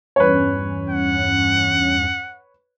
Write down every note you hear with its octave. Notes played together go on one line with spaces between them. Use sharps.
E2 G2 C#4 B4 C#5
F#5